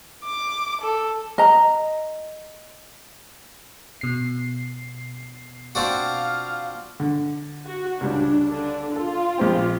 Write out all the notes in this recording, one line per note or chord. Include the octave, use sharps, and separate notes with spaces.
D6
A4
D#5 A#5
B2 C7
C4 D4 F4 F#4 F5
D3
F#4
C#2 G3 D4
D3 D4
F4 A4
A#1 C4 G5